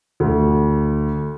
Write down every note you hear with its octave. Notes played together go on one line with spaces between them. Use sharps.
D2